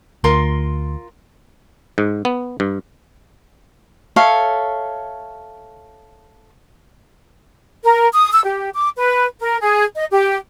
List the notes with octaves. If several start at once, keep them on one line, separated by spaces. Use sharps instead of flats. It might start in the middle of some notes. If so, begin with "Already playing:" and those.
D2 F4 A#4 C6
G#2
B3
G2
A4 C#5 E5 F5
A#4
D#6
E6
G4
D6
B4
A#4
G#4
D#5
G4